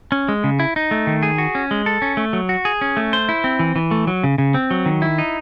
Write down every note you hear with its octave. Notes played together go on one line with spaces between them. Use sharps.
C#4
G#3
C#3
E4
D#4
A3
D#3
G#4
F#4
C#4
G#3
A4
C#4
A3
F#3
F#4
G#4
C#4
A3
C5
E4
C4
E3
E3
A3
F#3
C#3
C#3
C4
F#3
D#3
E4
D#4